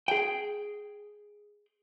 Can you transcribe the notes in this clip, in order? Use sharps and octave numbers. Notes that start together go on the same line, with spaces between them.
G#4 G5